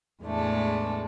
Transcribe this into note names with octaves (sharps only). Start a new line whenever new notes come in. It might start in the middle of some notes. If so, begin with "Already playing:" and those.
E2 A2 G#3 A3 D4